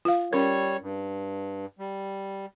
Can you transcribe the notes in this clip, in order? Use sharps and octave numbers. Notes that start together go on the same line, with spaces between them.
F4 F5
G3 C#4 A#4 C#5
G2
G3